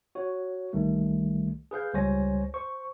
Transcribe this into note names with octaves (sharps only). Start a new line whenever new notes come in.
F#4 C#5
C2 D#3 G3 A3
G#4 B4 F5 G6
C#2 G3 C5 C#5 G#5 A#6
C5 C#6